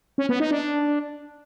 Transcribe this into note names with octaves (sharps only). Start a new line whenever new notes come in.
C#4
B3
D#4
D4